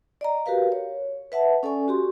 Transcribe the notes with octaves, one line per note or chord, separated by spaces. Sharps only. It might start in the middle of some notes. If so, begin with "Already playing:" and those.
D5 D#5 A#5
F#4 G4 A#4 B4 F5
C#5
B4 E5 F#5 A5
C#4 A4 D5 G#5 C#6
F#4 G4 C6